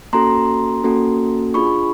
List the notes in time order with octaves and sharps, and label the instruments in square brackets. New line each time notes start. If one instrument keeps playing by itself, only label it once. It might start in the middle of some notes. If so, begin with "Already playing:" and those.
[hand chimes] A#3 C#4 F#4 A4 A#5 C6
A#3 C#4 F#4 A4
D4 F4 G#4 B5 C#6